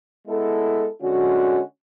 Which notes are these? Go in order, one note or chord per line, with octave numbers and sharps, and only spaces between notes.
G#3 B3 E4 A4
D3 G#3 C#4 F#4